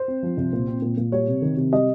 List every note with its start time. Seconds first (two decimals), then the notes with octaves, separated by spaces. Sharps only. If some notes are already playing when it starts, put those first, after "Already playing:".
Already playing: C5
0.08 C4
0.23 F3
0.37 C2
0.53 A#2
0.67 C4
0.82 A#2
0.98 A#2
1.12 G3 C#5
1.28 C3
1.42 D#3
1.57 C3
1.72 G3 D#5